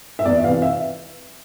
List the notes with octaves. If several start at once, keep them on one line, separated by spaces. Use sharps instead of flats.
E5
E2 D5
C3 E3 F5
E5